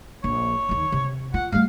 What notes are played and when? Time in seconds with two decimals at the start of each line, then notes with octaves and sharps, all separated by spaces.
0.24 A#1 C#5
0.69 D#2 D#3
0.92 C3
1.34 F4 F#5
1.52 G3 A3 F5